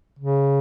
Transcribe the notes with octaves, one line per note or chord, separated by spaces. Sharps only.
C#3